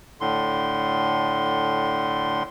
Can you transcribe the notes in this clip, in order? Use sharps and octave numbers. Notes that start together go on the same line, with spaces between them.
A2 D3 C6